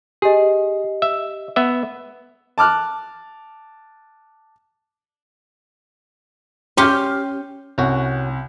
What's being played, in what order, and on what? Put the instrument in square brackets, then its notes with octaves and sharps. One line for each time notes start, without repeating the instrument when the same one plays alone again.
[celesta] G4 D#5 [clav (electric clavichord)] G#4
[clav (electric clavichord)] E5
B3 E5
[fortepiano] A5 D6 F6 F#6
[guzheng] C#4 G4 [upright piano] C6 F6 G6
[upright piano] C2 [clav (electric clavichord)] C#4 F#4